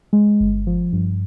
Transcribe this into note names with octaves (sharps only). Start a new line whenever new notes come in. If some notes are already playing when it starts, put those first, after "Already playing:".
G#3
G1
F3
G2